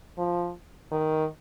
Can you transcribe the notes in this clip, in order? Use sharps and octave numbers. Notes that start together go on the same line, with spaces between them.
F3
D#3